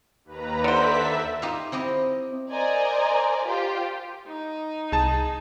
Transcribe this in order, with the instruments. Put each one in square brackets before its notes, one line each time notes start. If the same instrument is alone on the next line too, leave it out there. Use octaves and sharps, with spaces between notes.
[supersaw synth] D#2 B4 A#5
[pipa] D3 C5 [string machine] A4 D5 B6 [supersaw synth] E5
[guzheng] D#4 F4 G4 E5 F5
C4 E4 G4 D#5
[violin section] A#4 C5 D5 D#5 G#5 A#5
F4 G4 C5
[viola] D#4
[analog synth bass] C2 [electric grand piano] G#4 A5